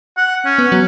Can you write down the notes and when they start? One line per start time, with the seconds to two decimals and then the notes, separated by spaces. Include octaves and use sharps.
0.17 F#5
0.45 C#4
0.58 B3
0.72 F#3